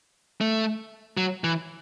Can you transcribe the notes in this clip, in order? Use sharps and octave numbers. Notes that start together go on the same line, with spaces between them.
A3
F#3
E3